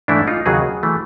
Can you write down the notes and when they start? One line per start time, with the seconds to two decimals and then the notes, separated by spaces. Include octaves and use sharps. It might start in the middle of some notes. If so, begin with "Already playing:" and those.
0.08 G#2 E3 A3 D4 E4
0.27 D#4 F4
0.46 D#2 C#3 F#3 F#4 G#4
0.83 E3 A3